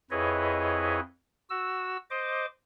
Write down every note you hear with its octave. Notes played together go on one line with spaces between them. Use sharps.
F2 E4 G#4 B4 C#5 D#5
F#4 E6
C5 D#5 D6